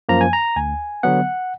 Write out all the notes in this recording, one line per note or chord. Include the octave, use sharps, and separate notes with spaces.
F#2 F3 A#3 A#5
G#5
A#5
D2 G#5
D3 F#3 B3 F#5